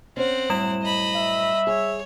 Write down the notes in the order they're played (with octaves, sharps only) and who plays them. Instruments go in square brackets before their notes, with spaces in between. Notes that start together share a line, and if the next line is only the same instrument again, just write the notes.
[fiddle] C4 F#5 [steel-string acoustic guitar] C#4 C5
[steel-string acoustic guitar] F#2 A2 E4 [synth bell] G3 E7
[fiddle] D#5 B5
[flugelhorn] E5
[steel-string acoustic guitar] G#4 [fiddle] C#5